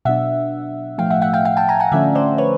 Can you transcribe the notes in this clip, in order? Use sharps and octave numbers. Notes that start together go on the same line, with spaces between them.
B2 F#3 B3 D4 E5 F#5
A2 F3 A3 F5 G5
E5 F#5
E5 F#5
F5 G5
F5 G5
G5 A5
G#5 A#5
F#5 G#5
D3 F3 A3 C#4 D5 E5
C5 D5
B4 C#5